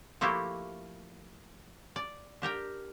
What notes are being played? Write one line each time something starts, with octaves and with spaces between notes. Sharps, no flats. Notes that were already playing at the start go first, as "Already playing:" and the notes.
F3 A3 A#3 E4 F#4 G4
D5
D4 G4 A#4 G5